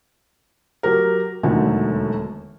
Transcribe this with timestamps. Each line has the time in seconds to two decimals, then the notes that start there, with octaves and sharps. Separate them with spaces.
0.83 F#3 G4 A#4
1.43 E1 D#2 D3 F#3 A3